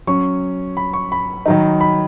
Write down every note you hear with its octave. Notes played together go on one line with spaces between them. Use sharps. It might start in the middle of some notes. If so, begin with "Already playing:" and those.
F#3 C#4 C#6
B5
C#6
B5
D#3 F#3 D#4
B5